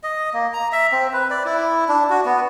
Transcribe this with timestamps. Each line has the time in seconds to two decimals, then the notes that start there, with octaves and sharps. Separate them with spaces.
0.03 D#5
0.33 A#3
0.53 A#5
0.72 E5
0.92 C4
1.13 B4
1.30 D5
1.45 E4
1.89 D4
2.10 F#4
2.25 B3